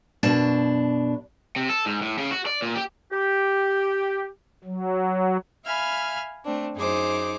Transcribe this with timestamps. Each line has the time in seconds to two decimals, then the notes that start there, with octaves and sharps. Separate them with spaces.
0.23 F#2 B2 D4 A5
1.56 C3
1.69 A4
1.86 G#2
2.01 A2
2.18 C#3
2.31 F#4
2.46 D5
2.62 A#2
2.76 G4
3.12 G4
4.64 F#3
5.65 E5 F5 G#5 B5 F6
6.44 A3 C4 D4
6.76 F#2 D#4 G#4 C5 D6